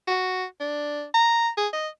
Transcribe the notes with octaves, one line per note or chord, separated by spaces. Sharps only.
F#4
D4
A#5
G#4
D#5